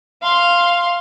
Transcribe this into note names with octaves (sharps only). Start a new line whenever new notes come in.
F5 C6